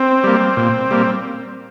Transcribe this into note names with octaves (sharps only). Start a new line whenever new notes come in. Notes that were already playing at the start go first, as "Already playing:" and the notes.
Already playing: C4
G3 A#3
A#2
G3 A#3